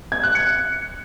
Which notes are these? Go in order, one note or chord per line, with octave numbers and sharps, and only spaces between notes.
G#6
F#6
C#7